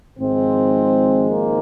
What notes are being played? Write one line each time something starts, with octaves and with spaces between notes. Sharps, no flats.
G#1 G#2 F3 G#3 C4
A#3